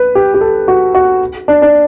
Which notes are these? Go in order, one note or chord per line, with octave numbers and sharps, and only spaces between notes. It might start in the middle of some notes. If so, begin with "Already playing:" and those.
Already playing: B4
G4
G4
A4
F#4
F#4
D4
D4